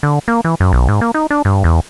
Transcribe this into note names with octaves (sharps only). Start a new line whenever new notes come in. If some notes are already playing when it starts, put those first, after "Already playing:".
D3
A#3
E3
F#2
B1
G#2
A#3
D#4
D4
G2
E2